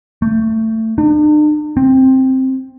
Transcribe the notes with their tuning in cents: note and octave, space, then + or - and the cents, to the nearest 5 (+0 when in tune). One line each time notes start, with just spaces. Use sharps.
A3 +20
D4 +45
C4 +5